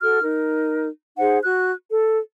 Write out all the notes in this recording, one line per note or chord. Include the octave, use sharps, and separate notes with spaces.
F#4 A4 F6
D#4 A#4
D#4 G#4 C5 F#5
F#4 F#6
A4